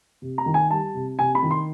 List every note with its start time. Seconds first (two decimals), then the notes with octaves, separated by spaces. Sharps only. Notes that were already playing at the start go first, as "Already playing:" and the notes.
0.22 C3
0.38 A#5
0.46 D#3
0.54 G#5
0.70 G3 A5
0.94 C3
1.19 C3 G#5
1.35 B5
1.43 D#3
1.51 C6